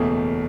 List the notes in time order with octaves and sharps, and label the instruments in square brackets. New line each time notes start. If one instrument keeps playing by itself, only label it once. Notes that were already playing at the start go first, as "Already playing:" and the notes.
Already playing: [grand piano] F#1 E2 B2 A3